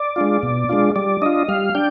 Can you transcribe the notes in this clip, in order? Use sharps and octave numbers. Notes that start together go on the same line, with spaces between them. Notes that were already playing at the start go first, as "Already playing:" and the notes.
Already playing: D5
G#3 D4 F4
B2
G#3 D4 F4
G3 D5
D4 F4 D#5
G3 F5
D4 G5